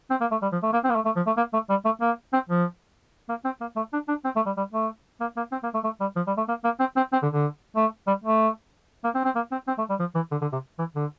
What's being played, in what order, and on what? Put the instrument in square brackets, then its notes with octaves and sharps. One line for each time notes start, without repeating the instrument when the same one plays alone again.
[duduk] C4
A#3
A3
G3
F3
A3
A#3
C4
A#3
A3
A3
F3
A3
A#3
A3
G3
A3
A#3
C4
F3
A#3
C4
A#3
A3
D4
D4
C4
A3
G3
G3
A3
A#3
A#3
C4
A#3
A3
A3
G3
F3
G3
A3
A#3
A#3
C4
C4
C4
D3
D3
A3
G3
A3
A#3
C4
C4
A#3
C4
C4
A3
G3
F3
E3
D3
D3
C3
E3
D3